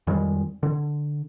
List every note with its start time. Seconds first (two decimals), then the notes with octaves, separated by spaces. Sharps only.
0.07 F2 D#3 G3 G#3
0.63 D3